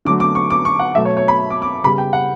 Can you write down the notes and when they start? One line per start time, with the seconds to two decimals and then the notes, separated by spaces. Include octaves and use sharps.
0.05 D3 F#3 A3 D6
0.20 D6
0.35 C#6
0.50 D6
0.65 C#6
0.79 F#5
0.95 B2 F#3 A3 E5
1.05 C#5
1.17 C#5
1.28 B5
1.50 D6
1.62 D6
1.84 C#3 G3 B3 B5
1.98 G5
2.13 F#5